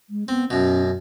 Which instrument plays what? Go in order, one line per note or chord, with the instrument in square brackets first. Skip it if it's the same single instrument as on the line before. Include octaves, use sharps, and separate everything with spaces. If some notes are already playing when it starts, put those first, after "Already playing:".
[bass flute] G#3
[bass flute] B3 [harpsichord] C4
[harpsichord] F#2 B2 [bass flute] C#4